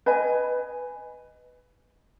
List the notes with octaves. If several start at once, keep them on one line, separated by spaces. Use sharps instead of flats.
B4 D#5 G#5